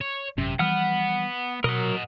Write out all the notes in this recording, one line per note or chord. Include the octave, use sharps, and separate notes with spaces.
C#5
G#1 F#2 C3 C#4
E3 F3 G3 B3 F#5 F6
B2 F#3 A#4 D#5 F#5